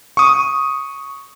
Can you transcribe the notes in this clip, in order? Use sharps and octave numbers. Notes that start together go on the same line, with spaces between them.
C#6 D#6